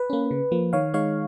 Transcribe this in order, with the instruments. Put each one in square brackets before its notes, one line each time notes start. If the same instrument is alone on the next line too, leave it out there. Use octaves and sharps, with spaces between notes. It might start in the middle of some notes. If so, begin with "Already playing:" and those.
Already playing: [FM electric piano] B4
A#3 C#4
C#3
F3 A#3
D#3 C#5 F5
G#3 D#4 C#5 F5